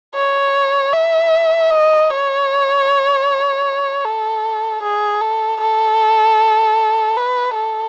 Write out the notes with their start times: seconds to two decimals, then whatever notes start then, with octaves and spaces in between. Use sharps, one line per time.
0.15 C#5
0.93 E5
1.70 D#5
2.10 C#5
4.05 A4
4.83 G#4
5.21 A4
5.61 A4
7.16 B4
7.55 A4